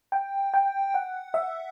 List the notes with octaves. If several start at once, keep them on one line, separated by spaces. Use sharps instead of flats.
G5
G5
F#5
E5